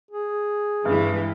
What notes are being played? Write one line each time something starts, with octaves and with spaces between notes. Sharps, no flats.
G#4
G2 E3 G#3